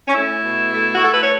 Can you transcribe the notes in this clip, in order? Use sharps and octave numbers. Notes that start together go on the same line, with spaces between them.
C#4
A3 E4
B2
A3
F#4
A3 A4
B4
C#5